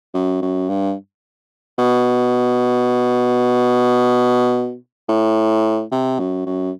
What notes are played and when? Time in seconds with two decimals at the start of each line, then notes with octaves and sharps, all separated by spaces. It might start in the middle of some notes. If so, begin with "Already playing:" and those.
0.14 F#2
0.42 F#2
0.69 G2
1.78 B2
5.09 A2
5.92 C3
6.19 F#2
6.46 F#2